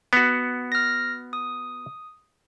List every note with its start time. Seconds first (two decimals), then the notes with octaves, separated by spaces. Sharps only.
0.13 B3 F#4
0.72 F6 A#6
1.33 D#6